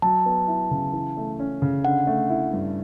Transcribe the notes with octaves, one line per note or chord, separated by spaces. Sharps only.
F#3 A5
B3
E4
C#3
E3
A3
C#4
C#3
D3 F#5
A3
E4
G2